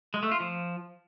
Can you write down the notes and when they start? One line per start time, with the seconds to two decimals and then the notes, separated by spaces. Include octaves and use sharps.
0.14 G#3
0.23 A3
0.31 F4
0.40 F3